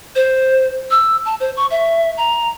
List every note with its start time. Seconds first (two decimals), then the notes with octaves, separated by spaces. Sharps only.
0.15 C5
0.91 E6
1.25 A5
1.40 C5
1.57 C#6
1.71 E5
2.17 A#5